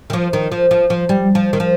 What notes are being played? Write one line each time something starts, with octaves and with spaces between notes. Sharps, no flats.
D#3
F3
D#3
F3
F3
F3
G3
F3
D#3
F3